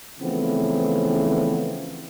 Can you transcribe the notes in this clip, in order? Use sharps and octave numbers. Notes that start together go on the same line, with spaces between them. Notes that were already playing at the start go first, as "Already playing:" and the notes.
C#3 E3 F3 A3 B3 C4